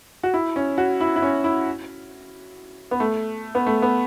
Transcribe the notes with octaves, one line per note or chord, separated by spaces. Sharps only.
F#4
E4
C#4
F#4
E4
E4
C#4
E4
B3
A3
B3
A3
B3